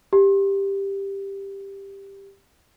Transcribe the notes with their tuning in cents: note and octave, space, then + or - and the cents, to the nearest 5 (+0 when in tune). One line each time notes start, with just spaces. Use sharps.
G4 +10